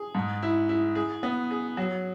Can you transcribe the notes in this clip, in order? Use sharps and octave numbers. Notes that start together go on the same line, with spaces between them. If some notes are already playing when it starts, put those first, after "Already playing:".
Already playing: G#4
G#2
E4
E4
G#4
B3
G#4
F#3